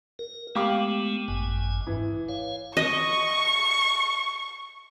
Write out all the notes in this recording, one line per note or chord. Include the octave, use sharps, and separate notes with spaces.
A#4
G#3 A3 B3 G4 F5 D6
G#1 F#2 G#5
G#2 E3
C#5 F5
D#5 C#6